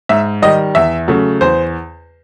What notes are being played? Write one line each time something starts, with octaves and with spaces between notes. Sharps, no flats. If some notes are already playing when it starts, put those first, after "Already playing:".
G#2 E5
D#3 G3 D#5
E2 E5
C#3 F#3 A3
E2 C5